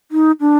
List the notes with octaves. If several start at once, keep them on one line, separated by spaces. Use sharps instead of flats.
D#4
D4